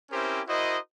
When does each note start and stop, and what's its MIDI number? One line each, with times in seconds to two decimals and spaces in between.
0.12 0.41 60
0.12 0.41 61
0.12 0.41 64
0.12 0.41 67
0.12 0.41 70
0.12 0.41 72
0.47 0.78 64
0.47 0.78 66
0.47 0.78 70
0.47 0.78 72
0.47 0.78 75